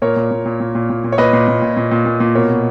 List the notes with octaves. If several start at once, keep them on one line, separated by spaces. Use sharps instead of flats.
A#2 A#4 C#5
A#2
A#2
A#2
A#2
A#2
A#2
A#2
C#5
A#2 B4 D#5
A#2
A#2
A#2
A#2
A#2
A#2
A#2
B2 A#4 C#5
B2